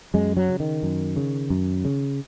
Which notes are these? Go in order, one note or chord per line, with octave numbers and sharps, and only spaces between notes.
F#2 G#3
F#3
C#3
D#3
F#2
C#3
F#2
C#3